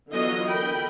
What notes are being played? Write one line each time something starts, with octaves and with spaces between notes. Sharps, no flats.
D3 E3 F#3 B3 F4 D#5
D3 A#4 G5 B5